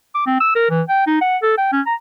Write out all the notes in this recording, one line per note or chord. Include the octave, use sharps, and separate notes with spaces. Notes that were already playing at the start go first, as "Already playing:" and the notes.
D6
C4
E6
A#4
E3
G5
D#4
F#5
A4
G5
C#4
A#5